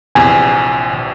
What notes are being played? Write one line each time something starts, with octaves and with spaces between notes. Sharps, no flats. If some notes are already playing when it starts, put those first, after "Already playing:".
A#1 E2 C3 G#5